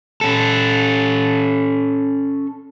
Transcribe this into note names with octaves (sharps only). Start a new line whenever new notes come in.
C#4 A4